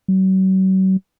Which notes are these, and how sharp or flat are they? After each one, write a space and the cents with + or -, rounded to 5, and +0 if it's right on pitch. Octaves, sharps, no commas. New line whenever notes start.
F#3 +40